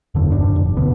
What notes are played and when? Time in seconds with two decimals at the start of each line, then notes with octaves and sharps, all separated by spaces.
0.15 F#1 E2 D3
0.32 D#1 G2 D4
0.56 F1
0.77 D2 B2 D3 B3